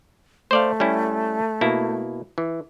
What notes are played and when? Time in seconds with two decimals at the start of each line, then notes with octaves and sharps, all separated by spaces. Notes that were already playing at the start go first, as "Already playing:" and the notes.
0.51 A3 C5 D5 F5
0.80 G3 C#4 E4
1.61 B2 A#3 E4
2.38 E3